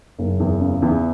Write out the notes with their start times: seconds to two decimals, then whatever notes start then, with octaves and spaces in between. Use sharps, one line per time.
0.19 F#1
0.40 E2
0.61 C#3
0.82 E2